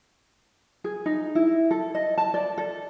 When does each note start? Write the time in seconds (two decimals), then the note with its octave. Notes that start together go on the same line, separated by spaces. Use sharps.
0.84 G#4
1.06 D#4
1.35 E4
1.71 A4
1.95 D#5
2.18 A5
2.34 D5
2.58 A4